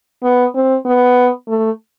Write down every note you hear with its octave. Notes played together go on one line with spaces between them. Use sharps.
B3
C4
B3
A3